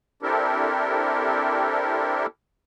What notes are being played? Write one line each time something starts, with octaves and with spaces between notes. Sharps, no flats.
C4 D4 E4 G4 A4 A#4